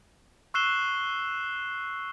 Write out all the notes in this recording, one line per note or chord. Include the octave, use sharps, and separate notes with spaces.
C#6 E6 F#6 C7 E7 G7